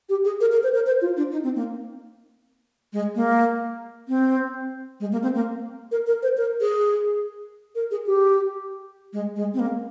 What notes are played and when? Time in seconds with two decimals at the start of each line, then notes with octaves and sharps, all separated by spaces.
0.09 G4
0.25 G#4
0.40 A#4
0.52 A#4
0.63 C5
0.74 A#4
0.86 C5
1.01 F4
1.17 D4
1.31 D#4
1.43 C4
1.56 A#3
2.93 G#3
3.15 A#3
4.08 C4
5.00 G#3
5.12 A#3
5.22 C4
5.35 A#3
5.91 A#4
6.07 A#4
6.22 C5
6.37 A#4
6.60 G#4
7.75 A#4
7.91 G#4
8.06 G4
9.13 G#3
9.36 G#3
9.54 C4
9.59 A#3